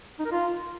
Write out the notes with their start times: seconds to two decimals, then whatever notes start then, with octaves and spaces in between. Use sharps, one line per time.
0.19 D#4
0.25 A#4
0.32 F4